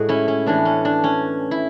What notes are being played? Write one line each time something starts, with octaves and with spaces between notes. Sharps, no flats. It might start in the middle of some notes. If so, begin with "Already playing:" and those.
Already playing: A2 G#3 F#4 G#4
C#4 E4
C#4
A2 E3 B3 D4
C#4
D4
C#4
E4